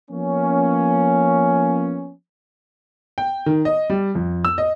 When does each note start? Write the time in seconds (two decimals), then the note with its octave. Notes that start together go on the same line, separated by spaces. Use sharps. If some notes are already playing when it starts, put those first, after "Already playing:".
0.10 F3 A#3 B3 C#4
3.18 G5
3.46 D#3
3.65 D#5
3.90 G3
4.15 F2
4.45 E6
4.58 D#5